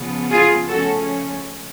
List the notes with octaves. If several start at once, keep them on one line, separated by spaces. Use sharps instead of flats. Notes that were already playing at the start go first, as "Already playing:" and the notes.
Already playing: C#3 F3 B3
F4 G#4
C#3 F3 A3 C#4 F#4 A4